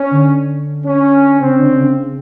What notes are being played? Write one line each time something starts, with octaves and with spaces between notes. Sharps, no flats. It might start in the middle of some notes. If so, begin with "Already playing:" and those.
Already playing: C#4
D3
C#4
C#3 C4
D3
C#3